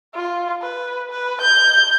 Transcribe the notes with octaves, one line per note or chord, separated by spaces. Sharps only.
F4
B4
B4
G6